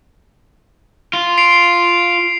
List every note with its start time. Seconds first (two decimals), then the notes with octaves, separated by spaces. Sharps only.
1.13 F4
1.38 C7 D7 F7